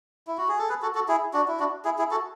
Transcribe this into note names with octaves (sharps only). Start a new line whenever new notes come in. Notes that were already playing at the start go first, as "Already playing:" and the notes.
E4
F#4
G#4
A4
G#4 B4
F#4 A4
F#4 A4
E4 G#4
D4 F#4
E4
D4 F#4
E4 G#4
E4 G#4
F#4 A4